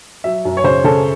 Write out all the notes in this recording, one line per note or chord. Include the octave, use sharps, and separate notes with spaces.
F#3 E5
F#2
C#5
C#3 C5
C#3 A4